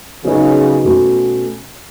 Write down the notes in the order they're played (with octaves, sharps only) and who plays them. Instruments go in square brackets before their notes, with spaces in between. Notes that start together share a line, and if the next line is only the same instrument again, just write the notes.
[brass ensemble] C#3 [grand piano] F#3 B3 D#4 F#4
[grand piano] B2 A3 C#4 F#4